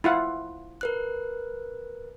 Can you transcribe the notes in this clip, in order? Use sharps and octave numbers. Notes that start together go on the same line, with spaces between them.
E4 F4 F#5
A#4 B4 F#6